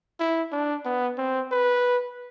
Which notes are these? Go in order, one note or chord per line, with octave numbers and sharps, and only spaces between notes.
E4
D4
B3
C4
B4